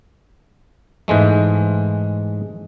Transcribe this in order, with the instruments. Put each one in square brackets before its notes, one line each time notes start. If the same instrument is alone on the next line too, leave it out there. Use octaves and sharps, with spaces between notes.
[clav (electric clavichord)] G#2 E3 G#3 A3